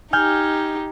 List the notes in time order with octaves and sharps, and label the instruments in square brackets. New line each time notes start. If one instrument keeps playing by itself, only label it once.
[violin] D#4 G4 [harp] G#5 F6 G6